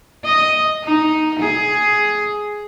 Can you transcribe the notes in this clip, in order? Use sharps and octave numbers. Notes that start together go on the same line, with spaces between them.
D#5
D#4
G#4